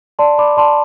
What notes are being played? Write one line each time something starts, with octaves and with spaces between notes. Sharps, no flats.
D5 A5 C6
D5 B5 D6
D5 A5 C6